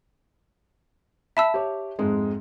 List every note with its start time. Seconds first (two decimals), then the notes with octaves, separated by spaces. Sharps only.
1.37 E5 A5 B5 E6
1.54 G4 C#5
1.99 F2 G#2 G#3